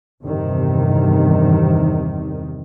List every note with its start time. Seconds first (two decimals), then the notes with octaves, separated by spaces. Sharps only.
0.23 E2 G2 C3 D#3